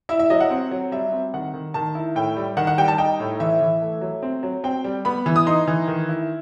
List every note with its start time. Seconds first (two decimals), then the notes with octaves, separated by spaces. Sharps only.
0.09 E4 E5
0.19 E5
0.30 F#3 D#5
0.40 F#5
0.50 C4
0.71 F#3
0.91 G3 E5
1.12 C4
1.33 D#3 F#5
1.54 D#3
1.74 D#3 A5
1.95 E4
2.15 A2 G5
2.37 G3
2.57 D#3 F#5
2.67 F#5
2.78 G3 G5
2.88 A5
2.98 D#4 G5
3.20 A2
3.40 E3 E5
3.61 E3
3.81 A3
4.01 F#3
4.23 C4
4.43 F#3
4.64 C4 G5
4.84 G3
5.05 B3 B5
5.26 E3
5.36 D#6
5.47 D#4 C6
5.68 E3
5.88 D#3
6.09 E4